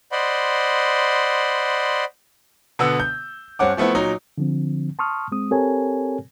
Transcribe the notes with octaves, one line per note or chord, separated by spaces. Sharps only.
C5 D5 D#5 F#5 B5 C6
B2 D3 B3 E6
G6
G2 C4 C#4 F#5 D6
F3 A3 B3 C4 E4
A#2 F#3 D#4
D3 F3 C4
A5 C6 C#6 D#6 F6
G#3 C4 D#6
C4 G4 A4 A#4 C#5 G#5